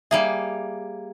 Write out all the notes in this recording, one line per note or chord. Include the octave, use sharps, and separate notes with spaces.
G3 A#3 G#4 E5